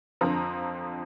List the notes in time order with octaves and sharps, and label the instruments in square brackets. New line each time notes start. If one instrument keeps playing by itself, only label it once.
[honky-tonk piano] F2 D3 F3 C4 A#5